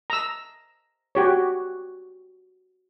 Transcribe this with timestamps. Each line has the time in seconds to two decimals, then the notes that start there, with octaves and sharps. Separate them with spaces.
0.10 A#5 E6
1.15 F#4 G4 C#5